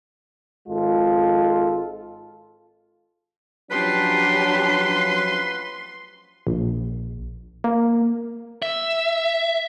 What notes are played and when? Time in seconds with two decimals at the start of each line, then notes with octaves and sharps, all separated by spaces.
0.68 G#1 G#3 F4 A4
3.71 F3 F#3 C#4 D4 G4 B4 C6
6.47 A#1
7.64 A#3
8.62 E5